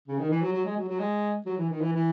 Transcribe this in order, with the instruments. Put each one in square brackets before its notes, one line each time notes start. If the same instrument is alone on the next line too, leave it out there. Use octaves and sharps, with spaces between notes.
[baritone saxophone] C#3
D#3
E3
F#3
F#3
G#3
F#3
F#3
G#3
F#3
E3
D#3
E3
E3